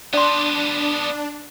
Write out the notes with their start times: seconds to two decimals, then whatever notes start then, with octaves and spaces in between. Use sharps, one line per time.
0.13 B3 D4 G4 D5 C6